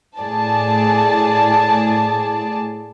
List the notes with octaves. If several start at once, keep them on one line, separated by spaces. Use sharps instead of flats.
A2 G#4 D5 A5